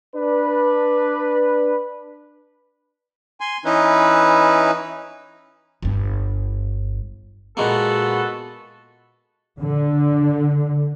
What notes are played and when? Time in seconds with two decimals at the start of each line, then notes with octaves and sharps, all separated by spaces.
0.16 D4 B4
3.41 G#5 C6
3.65 E3 C#4 D#4 E4 B4
5.82 G1 G2
7.57 A#2 G#3 A#3 B3 F#4 A4
9.62 D3